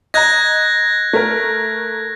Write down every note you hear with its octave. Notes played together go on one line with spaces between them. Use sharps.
D#5 A#5 F#6 G#6 A#6
A3 A#4